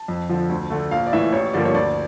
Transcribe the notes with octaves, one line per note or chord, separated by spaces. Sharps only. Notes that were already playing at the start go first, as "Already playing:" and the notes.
Already playing: A5
F2
D3 F3
D2
D3 A3
A#1 F5
D5
A2 E3 E5
A1 C#5
G2 D3 F3 A#3 D5
C#5
D2 D5